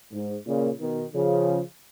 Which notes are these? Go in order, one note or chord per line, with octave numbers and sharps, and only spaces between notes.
G#2
A#2 C#3
B2 D#3
C#3 F3